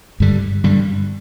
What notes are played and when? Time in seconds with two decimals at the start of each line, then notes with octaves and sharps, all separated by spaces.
0.20 G2 D3 G3
0.64 G2 D3 G3